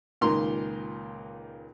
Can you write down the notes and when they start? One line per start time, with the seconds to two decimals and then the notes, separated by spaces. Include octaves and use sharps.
0.21 C#2 A#2 D#3 A#5 C6